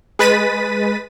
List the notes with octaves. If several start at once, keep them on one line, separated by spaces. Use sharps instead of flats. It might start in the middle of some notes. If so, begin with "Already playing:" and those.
G#3 B4 A6 B6 D#7